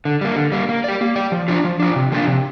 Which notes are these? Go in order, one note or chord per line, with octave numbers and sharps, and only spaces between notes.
D3
G3 A#3
D3
G3 A#3
A#3
G4 D5
A#3
G4 D5
F3
D4 F4 D5
F3
D4 F4 D5
C3
F3 A#3 D4 F4
C3